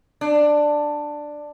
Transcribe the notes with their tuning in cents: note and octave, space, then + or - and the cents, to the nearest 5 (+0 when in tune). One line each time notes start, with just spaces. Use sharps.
D4 +10